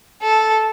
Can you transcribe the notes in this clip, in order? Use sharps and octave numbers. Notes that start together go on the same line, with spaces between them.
A4